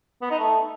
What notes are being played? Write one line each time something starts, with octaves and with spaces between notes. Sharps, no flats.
B3
D#4
A3